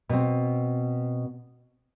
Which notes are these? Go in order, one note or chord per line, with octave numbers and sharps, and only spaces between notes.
B2 C4